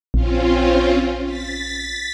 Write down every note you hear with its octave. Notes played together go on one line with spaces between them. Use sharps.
A#1 C4 C#4 F4
A6 B6